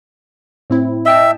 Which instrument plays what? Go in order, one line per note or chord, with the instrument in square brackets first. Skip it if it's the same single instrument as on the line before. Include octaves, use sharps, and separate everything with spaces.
[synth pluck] A2 C4 E4
[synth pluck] D#5 G5 A5 [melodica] E5